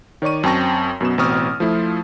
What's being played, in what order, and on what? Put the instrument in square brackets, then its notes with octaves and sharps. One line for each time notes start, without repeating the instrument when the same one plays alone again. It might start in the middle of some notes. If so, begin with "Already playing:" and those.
[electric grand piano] D#3 C#5 D5 C#6 D#7
F#2 C4 G5 A5 C#6 A#6
F#2 B2 B3 E7
A1 B2 C4 C#6 D#6 F6
F3 A3 E4 F4